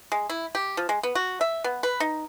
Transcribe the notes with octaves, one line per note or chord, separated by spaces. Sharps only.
G#3
E4
G4
F3
G#3
B3
F#4
E5
B3
B4
D#4